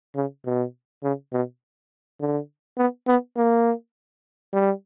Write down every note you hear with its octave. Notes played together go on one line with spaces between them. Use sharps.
C#3
B2
C#3
B2
D3
B3
B3
A#3
G3